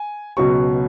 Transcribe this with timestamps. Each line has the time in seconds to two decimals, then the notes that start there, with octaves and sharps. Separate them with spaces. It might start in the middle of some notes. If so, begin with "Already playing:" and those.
Already playing: G#5
0.37 C#2 B2 F#3 C#6